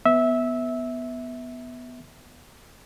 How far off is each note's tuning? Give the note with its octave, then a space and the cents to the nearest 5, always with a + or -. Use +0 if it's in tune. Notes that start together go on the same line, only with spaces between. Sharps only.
B3 +0 E5 -15